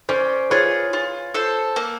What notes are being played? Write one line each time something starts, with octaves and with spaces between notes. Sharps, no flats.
C#4 C5 D5
F4 G#4 B4 C#5
F4
A4 C5
A#3